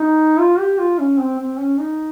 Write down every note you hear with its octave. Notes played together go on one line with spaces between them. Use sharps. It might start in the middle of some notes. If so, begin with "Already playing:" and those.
Already playing: D#4
F4
G4
F4
C#4
C4
C4
C#4
D#4